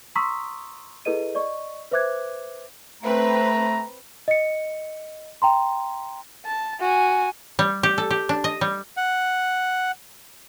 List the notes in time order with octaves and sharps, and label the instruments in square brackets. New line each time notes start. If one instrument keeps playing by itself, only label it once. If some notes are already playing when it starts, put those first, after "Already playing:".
[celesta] A#5 C6 C#6 D#6 E6 B6
E4 G#4 A4 B4 D#5 D#7
D5 D#5 C#6
B4 C5 E5 D6 F#6 G#6
[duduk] A3 [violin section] C4 B4 [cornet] A#5
[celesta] D#5 C#7
G5 A#5 C6
[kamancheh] A5
F#4 G#5
[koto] G3
G4
A4
G4
D4
D#5
G3
[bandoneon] F#5